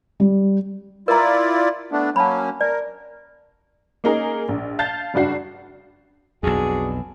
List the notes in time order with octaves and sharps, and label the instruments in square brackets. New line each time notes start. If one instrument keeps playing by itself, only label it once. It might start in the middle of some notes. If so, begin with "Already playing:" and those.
[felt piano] G3
[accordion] E4 F4 D5 [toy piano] A#4 A#5
[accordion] A3 B3 D4
[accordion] F#3 A#3 C#4 [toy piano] A5 B5
[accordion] A#4 [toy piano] D5
[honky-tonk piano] A#3 C#4 D#4 G#4 A#4
A#1
F5 A5 G6 A6
F#1 G2 D4 F#4 C7
[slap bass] B1 F2 [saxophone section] D4 F#4 G#4